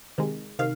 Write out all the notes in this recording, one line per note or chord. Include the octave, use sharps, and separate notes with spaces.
C3 D#3 G#3
C3 D#3 F5